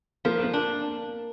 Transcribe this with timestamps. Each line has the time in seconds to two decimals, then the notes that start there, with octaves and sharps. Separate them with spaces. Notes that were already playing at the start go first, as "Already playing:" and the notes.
0.25 F3 A#3
0.44 A#3
0.53 D4